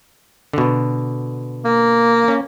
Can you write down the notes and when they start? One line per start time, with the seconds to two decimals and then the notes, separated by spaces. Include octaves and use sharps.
0.53 B2 D3
1.65 A#3
2.28 C#4